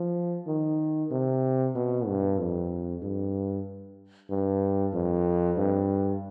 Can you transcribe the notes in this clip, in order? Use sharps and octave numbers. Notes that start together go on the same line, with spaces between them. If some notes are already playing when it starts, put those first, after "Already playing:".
Already playing: F3
D#3
C3
B2
G2
F2
G2
G2
F2
G2